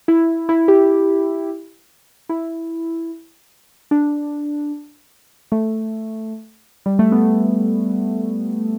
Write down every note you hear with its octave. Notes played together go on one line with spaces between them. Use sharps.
E4
E4
G4
E4
D4
A3
G3
A3
B3